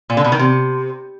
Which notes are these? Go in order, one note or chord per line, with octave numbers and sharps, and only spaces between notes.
A#2
D3
B2
D#3
C3